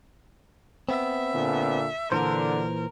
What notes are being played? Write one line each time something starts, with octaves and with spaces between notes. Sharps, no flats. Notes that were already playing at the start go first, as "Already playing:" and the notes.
B3 C4 E5
A#2 D3
A#2 D3 E3 A#4 C5